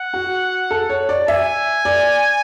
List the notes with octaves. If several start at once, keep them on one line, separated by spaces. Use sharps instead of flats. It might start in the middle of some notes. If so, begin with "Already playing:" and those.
Already playing: F#5
F#4
A4
C#5
D5
E5 G#5
D5